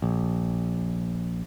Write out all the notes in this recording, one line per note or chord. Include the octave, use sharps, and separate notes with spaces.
A#1